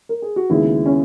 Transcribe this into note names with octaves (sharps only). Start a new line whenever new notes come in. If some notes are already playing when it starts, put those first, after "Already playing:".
A#4
G#4
F#4
D#2 C#3 G#3 B3 E4
C#4